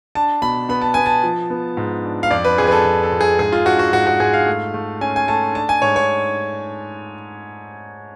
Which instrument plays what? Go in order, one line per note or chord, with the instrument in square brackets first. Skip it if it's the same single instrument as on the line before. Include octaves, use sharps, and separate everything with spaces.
[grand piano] D4 A5
B2 B5
B3 B5
A5
B3 G#5
A5
F3
B3
G#2
D4
F5
F2 D5
B4
F2 G#4
B4
A4
F2
A4
F2
G#4
G#2 G#4
F4
D4 F#4
F#4
G#2 F#4
F#4
G#2 G#4
F5
A3
A3
C#4 G#5
G#5
A3 A5
D4 A5
G#5
G#2 C#5
C#5